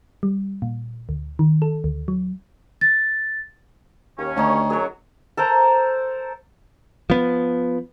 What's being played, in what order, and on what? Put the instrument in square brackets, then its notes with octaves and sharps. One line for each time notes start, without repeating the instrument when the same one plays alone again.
[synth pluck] G3
A#2
D2
D#3
A4
D2
F#3
[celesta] A6
[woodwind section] D#2 C#4
[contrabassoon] D2 [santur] D#4 C#5 A5
[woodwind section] F#2 F#3 [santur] G#4 C#5
[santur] A4 A#4 C5 A#5
[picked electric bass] F3 B3